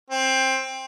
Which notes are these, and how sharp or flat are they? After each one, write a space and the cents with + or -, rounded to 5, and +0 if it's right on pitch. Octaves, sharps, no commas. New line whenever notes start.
C4 +15